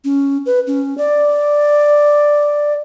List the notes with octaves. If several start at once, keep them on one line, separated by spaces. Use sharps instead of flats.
C#4
B4
C#4
D5